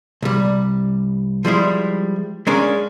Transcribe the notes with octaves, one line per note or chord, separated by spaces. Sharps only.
C2 G3
F3 G3 G#3 E4
G#3 A#3 C#4 D4 A#4